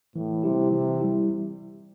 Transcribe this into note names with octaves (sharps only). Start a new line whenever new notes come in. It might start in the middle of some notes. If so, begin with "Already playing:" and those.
A2 E3
C3 G3 E4 G4
C3 E3
G3 E4 G4